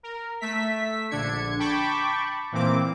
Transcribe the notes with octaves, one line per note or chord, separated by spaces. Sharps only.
A#4
A3 E5 B6
A#1 D3 D4 G#6 C#7
G5 A5 B5 C#6 D6
A#2 E3 A#3 C4 D6